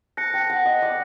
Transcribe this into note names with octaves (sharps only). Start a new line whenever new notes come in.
A5 F#6 A#6 C#7
G5
F#5
D#5
D5